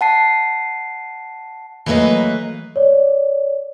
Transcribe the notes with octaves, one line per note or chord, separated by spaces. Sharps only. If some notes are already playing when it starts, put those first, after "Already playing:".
F#5 A5 C7
E3 F#3 A3 A#3 B4 D#5
C#5 D5